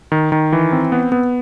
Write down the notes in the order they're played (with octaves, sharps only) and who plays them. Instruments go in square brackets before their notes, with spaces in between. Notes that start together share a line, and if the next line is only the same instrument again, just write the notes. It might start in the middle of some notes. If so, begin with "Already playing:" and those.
[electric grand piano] D#3
D#3
E3
C4
B3
B3